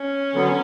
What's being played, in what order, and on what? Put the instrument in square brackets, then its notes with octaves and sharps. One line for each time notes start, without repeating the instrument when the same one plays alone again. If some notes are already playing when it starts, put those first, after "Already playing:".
Already playing: [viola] C#4
[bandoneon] D3 F#3 B3